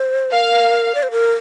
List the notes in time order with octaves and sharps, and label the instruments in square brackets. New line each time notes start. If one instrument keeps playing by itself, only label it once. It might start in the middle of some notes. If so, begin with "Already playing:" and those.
Already playing: [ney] C5
[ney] A#4 [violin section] F5
[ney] D5
C5
A#4